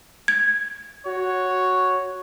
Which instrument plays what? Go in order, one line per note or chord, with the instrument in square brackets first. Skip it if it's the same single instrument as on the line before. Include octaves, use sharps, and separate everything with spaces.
[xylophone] G#6
[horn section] F#4 C#5